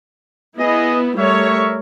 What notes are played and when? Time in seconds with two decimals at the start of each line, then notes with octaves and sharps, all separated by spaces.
0.58 B3 E4 G#4 D#5
1.17 G3 A3 A#4 C#5 E5 C#6